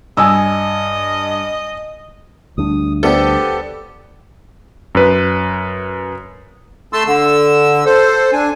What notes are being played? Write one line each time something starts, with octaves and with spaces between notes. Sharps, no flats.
G2 D#5 G#5 D#6 E6
D2 G3 D4 D#6
B3 G4 A4 C5 D5
F#2 B4
A3 A5 C6 E6
D3 E6
A4 C5
D4 G#5